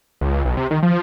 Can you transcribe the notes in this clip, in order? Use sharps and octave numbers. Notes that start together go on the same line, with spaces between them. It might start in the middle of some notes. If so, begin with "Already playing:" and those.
C#2
B1
C3
D#3
F3